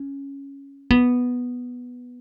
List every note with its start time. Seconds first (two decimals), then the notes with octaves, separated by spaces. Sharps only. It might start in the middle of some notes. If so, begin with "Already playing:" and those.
Already playing: C#4
0.90 B3